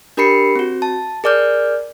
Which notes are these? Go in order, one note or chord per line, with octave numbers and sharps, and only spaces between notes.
D4 G4 A#4 B5 C7 C#7
C4 F#4
A5
G#4 A#4 D5 D6 F6 G6